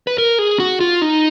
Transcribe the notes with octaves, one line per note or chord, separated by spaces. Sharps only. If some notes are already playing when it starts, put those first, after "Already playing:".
B4
A#4
G#4
F#4
F4
D#4